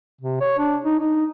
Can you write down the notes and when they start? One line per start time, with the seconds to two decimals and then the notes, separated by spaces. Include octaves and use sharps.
0.21 C3
0.41 C#5
0.58 D4
0.84 D#4
0.99 D#4